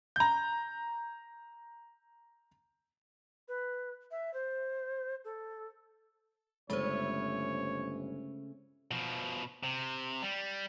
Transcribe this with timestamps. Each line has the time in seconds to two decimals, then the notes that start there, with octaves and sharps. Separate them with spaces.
0.16 A#5 G6
3.48 B4
4.11 E5
4.34 C5
5.25 A4
6.70 G1 C#3 G#3 A3 C#4 C5 C#5
8.91 B2 F3
9.63 C3
10.22 G3